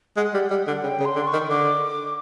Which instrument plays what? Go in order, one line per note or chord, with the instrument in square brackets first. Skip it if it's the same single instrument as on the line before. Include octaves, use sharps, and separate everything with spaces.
[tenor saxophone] G#3 [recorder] F#5
[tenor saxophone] G3
G3
D3
[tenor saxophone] C#3 [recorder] G5
[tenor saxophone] C#3
[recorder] C6
[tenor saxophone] D3
[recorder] C#6
[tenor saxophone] D#3
[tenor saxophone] D3 [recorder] D6